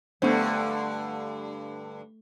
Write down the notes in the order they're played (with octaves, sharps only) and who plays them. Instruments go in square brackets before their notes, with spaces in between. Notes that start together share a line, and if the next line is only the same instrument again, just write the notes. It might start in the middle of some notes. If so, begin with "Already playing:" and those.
[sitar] G2 D3 [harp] A3 C#6 E6 [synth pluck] B3 D4 C5